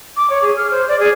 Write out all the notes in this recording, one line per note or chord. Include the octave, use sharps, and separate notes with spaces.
D6
C#5
G#4
F6
C5
D5
G#4